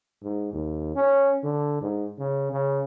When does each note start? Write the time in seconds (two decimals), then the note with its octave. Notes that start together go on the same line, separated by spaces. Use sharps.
0.23 G#2
0.53 D#2
0.96 C#4
1.44 D3
1.82 G#2
2.19 C#3
2.52 C#3